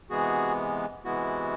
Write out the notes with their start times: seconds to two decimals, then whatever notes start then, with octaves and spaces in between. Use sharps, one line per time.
0.10 C3 E3 G#3 B3 F#4 G#4
1.05 C3 E3 G#3 B3 E4 F#4